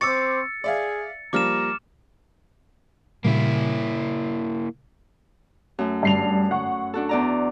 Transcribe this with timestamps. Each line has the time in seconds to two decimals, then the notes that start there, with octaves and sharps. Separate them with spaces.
0.01 C4 C#6 D6 E6 A6 C#7
0.64 G#4 D5 E5 F5
1.33 F3 G3 A#3 A#5 D6 F6 E7
3.24 A#2 C#3 G3 A#3 E4
5.79 F#2 A3
6.03 G2 C7 F7
6.51 F#5 C#6
6.94 D4 F#4 A4
7.09 E2 D5 A#5